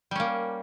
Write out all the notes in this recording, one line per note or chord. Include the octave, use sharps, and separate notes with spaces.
G3 A#3 C#4